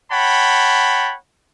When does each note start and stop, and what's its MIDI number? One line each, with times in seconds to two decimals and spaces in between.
0.11 1.15 73
0.11 1.15 78
0.11 1.15 79
0.11 1.15 81
0.11 1.15 83